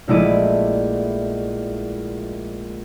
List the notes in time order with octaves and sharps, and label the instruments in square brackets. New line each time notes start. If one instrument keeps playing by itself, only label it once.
[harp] A#1 G#3 A3 E4 D5 D#7